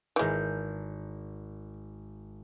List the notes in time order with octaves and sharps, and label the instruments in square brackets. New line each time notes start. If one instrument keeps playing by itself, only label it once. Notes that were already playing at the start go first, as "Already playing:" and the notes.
[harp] G#1 A#4 G6 [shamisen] E3 G#3